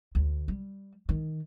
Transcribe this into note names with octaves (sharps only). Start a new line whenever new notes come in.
D2
G3
D#3